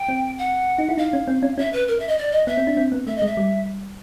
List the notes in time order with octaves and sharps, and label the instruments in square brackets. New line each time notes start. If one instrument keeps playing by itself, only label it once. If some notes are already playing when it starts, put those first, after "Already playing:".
Already playing: [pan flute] G5
[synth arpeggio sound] C4
[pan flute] F#5
[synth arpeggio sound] D#4
E4
[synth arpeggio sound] D#4 [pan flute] F5
[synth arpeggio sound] C#4
C4
C#4
[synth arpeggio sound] C#4 [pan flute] E5
[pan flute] B4
A#4
E5
D#5
D5
D#5
[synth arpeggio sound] B3 [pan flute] E5
[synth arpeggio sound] C4
D4
C4
B3
[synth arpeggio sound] A3 [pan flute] E5
[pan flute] D#5
[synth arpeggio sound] G#3 [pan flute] E5
[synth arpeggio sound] G3